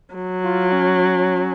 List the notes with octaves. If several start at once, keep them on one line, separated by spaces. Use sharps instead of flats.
F#3
F4
C#4